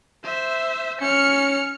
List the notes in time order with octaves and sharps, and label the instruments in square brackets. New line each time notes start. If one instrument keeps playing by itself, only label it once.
[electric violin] C5 E5
[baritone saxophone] C#4 [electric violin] F6 C#7